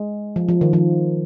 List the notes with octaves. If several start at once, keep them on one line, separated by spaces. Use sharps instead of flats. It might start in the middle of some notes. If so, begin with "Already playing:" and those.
Already playing: G#3
F3
F3
D#3
F3